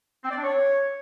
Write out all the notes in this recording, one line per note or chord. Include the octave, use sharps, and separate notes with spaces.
C4
D5
D4
C#5